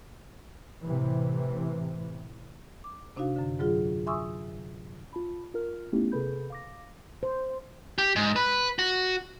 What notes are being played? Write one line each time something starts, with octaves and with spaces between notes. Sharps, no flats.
A2 C3 E3
D6
C3 D4 D#4 F#4 F5
F#2 D3
G#2 D3 F#3 F4 G#4
E5 G#5 C6 C#6 D#6 E6
F4 A5 B5
F4 A#4 F6
A3 B3 C#4 D#4 E4 G4
C3 G#4 A4 B4 B5 G6
F5 D6 A#6
C5
G4
G#2
B4
F#4